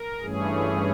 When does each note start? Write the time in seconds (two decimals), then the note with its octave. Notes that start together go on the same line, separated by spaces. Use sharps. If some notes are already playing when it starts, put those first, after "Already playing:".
Already playing: A#4
0.21 G2 E3 A3 C#4 G#4